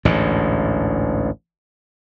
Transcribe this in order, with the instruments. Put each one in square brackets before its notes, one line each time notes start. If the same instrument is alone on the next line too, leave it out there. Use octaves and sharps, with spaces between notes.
[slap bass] A1 D2 G#2